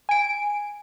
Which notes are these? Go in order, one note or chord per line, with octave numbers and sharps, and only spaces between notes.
G#5 D7